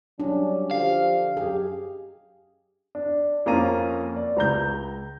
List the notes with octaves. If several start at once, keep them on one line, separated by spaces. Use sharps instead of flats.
F#3 G3 C#4 D4
D3 F3 G4 F5
F#2 G4 G#4
D4
F2 A#3 C#4 F4 A#5 D#7
D5
C#2 A#5 G6